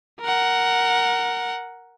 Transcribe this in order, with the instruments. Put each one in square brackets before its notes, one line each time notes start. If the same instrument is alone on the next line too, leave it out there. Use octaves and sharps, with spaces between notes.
[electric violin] A#4 F#5